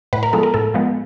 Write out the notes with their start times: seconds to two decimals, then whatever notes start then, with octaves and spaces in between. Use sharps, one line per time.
0.13 A2 B4
0.23 A#4
0.33 F3 G#3 B3 A4
0.43 A#4
0.54 A2 A4
0.74 F3 G#3 B3